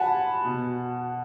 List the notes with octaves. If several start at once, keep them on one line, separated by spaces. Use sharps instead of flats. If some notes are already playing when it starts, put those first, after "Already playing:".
Already playing: F#5 G#5 A5 B5
B2